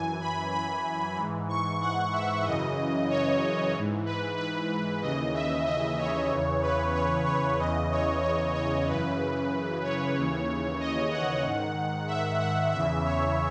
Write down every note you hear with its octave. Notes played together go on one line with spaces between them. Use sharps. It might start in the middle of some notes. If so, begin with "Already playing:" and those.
Already playing: F#2 E3 G#5
B5
B5
G#2 E3
C#6
F#5
E5
F#2 C#3 E3 D#5
C#5
G#2 E3
B4
B4
D#2 C#3 E3 D#5
E5
D#5
C#5
E2 C#3 E3
B4
C#5
C#5
E2 C#3 E3 D#5
C#5
C#5
C#5
F#2 C#3 E3 B4
C#5
D#2 C#3 E3
D#5
F#5
G#2 D#3
E5
F#5
E2 C#3 E3 E5
C#5